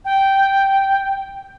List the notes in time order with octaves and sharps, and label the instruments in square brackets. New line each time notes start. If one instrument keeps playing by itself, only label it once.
[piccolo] G5